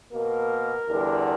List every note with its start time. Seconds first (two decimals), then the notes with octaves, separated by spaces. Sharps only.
0.12 B2 A#3 A#4
0.89 E2 D3 G3